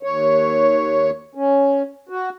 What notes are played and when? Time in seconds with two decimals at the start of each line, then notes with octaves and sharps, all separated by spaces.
0.03 D#2 C#5
1.35 C#4
2.09 F#4